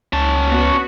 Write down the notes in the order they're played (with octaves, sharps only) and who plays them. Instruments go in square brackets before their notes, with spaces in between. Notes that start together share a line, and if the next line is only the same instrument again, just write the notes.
[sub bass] C#2 [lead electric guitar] C#4 A5
[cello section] B3 F#4